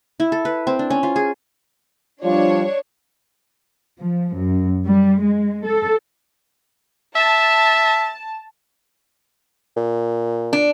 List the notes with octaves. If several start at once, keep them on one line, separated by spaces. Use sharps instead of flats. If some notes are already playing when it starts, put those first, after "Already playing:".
E4
A4
B4
C4
D4
C#4
F4
G#4
F3 G3 D4 F4 C#5
F3
F#2
G3
G#3
A4
E5 A5
A#2
D4